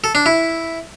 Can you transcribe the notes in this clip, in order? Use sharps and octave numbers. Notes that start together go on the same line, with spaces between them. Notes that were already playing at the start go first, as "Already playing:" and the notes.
A4
D4
E4